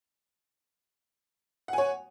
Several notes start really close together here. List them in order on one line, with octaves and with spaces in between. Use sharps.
F#5 G#5 C#5